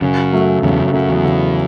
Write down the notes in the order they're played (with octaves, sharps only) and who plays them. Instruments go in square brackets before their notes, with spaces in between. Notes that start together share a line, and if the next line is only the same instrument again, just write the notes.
[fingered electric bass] F#2 [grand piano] C#3
[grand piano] F#3 A3
[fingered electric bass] E2 G#2 [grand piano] C#3
[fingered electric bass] F#2
[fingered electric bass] F#2 [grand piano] F#3 A3
[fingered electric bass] E2
[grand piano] C#3